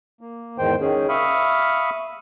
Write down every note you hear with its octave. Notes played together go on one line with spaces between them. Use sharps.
A#3
E2 G#2 D#3 C5 G5
D#3 C#4 G#4
E5 F5 B5 C#6 D#6 F6